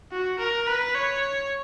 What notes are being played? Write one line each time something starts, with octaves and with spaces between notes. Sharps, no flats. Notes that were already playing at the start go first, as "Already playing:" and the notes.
F#4
A#4
B4
C#5